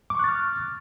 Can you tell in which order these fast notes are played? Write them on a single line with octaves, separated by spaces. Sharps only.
D6 C#6 F#6 A6 F6